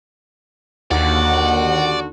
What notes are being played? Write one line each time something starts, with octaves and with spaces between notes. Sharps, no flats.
D#2 D3 F#4 D5 F#5